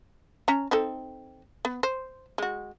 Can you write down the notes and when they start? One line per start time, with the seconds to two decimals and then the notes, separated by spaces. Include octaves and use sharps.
0.48 C#4 A#5
0.71 C4 D#4 A4
1.65 B3
1.83 C5
2.38 G#3 F#4